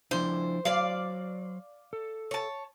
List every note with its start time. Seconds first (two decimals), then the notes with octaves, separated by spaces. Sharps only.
0.11 F3 D4 E4 C5
0.65 F#3 C5 D5 F5
1.93 A4
2.31 C#5 A5